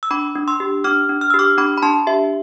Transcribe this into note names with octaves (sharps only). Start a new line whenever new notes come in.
E6
D4 B5 D6
D4
C6 E6
G4
D4 D6 F6
D4
F6
G4 E6
D6 F6
D4 B5 D6
B5
D4 A5 C6
G4 E5